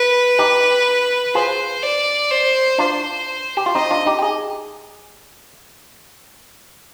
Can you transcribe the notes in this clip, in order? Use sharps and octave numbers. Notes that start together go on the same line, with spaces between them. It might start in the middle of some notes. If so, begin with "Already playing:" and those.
Already playing: B4
D#4 G4
F4 G#4 C5
D5
C5
D4 F4 C5
G4
F4
C4 D#4 D#5
D4 F4
D#4 G4
G4
G#4